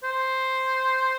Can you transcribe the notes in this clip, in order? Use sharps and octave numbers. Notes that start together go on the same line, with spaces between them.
C5